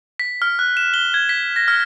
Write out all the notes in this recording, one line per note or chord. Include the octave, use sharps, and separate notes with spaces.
B6
F6
F#6
E7
G7
G#6
B6
A#6
F6